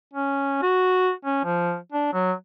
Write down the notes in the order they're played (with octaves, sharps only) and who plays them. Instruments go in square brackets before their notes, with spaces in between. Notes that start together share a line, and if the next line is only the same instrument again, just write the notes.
[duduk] C#4
F#4
C#4
F3
D4
F#3